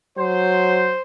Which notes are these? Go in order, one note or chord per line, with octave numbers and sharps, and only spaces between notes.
F#3 C5